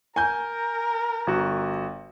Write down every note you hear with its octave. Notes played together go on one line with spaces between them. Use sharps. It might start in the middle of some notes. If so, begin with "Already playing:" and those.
A#4 G#5 G6
G1 F#4